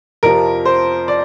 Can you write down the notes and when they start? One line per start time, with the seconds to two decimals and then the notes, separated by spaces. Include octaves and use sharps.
0.23 F2 C3 F3 A#4
0.65 C5
1.08 D5